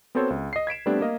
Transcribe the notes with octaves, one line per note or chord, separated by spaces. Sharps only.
B3 C4 F#4 A4 C5 C#5
C#2
D#5 C7
G#6 B6 D7 E7
G3 A3 B3 C4 D4 G4
A#3 D#5 F5